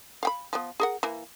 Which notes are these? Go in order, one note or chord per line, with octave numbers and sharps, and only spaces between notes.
F5 G5 B5
F3 B3
G#4 A#4 F#5
E3 A#3